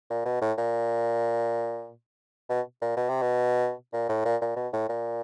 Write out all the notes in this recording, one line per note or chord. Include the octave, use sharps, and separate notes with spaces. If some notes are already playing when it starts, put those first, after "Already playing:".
A#2
B2
A2
A#2
B2
A#2
B2
C3
B2
A#2
A2
A#2
A#2
B2
A2
A#2